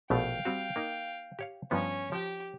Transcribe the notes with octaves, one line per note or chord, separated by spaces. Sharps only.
A#1 B2 A3 F5 G5
G3 C4 F#4
A#3 D#4
G4 C#5 F5
G2 F3 B3 C#4
F3 G4 G5